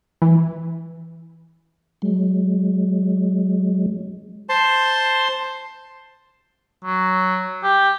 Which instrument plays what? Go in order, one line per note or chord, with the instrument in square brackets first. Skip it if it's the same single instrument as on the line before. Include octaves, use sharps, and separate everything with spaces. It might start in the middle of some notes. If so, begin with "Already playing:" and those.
[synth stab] E3
[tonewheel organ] F#3 G#3
[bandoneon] C5 A5 C6
[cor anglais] F#3
G4